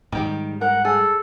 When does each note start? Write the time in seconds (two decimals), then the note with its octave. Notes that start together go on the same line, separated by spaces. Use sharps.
0.12 G#2 D#3 G3 G4
0.61 A#4 F#5
0.85 G#4 A4